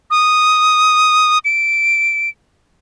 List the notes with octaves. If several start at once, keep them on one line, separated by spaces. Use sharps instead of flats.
D#6
D7